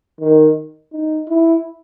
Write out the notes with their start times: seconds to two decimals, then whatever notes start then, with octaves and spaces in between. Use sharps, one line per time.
0.20 D#3
0.93 D#4
1.29 E4